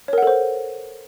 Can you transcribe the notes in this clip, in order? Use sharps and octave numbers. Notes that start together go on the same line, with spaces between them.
A4 A#4 C5 C#5 F#5